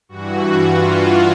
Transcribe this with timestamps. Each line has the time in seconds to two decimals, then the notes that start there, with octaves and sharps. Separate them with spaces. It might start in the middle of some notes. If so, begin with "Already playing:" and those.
0.09 G2 E3 F#4
0.66 F4